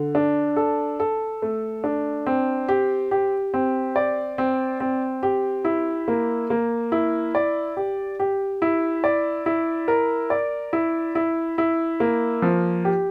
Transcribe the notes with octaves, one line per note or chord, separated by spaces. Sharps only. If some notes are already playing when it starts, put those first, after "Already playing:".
Already playing: D3
D4
A4
A4
A3
D4
C4
G4
G4
C4
D5
C4
C4
G4
E4
A#3
A#3
E4
D5
G4
G4
E4
D5
E4
A#4
D5
E4
E4
E4
A#3
F3
G4